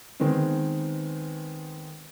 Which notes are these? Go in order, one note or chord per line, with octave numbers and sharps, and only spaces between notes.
D#3 G#3 B3 C4